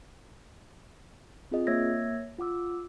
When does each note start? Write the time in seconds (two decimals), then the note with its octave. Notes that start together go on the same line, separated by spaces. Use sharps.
1.51 C4 F4 G#4 D#5
1.67 A#3 C#5 E5 E6 G#6 A#6
2.38 F4 F#5 D6 E6